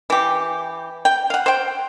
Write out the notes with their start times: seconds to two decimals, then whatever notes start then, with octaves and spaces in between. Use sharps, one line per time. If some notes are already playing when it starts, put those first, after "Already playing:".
0.10 E3 G4
1.05 G5
1.30 F5 F#5
1.46 C5 G5